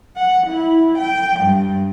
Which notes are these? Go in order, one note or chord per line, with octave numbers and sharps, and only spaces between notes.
F#5
E4
G5
G2